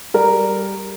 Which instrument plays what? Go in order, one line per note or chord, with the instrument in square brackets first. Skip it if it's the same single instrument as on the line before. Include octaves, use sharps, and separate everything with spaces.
[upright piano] G3 A#4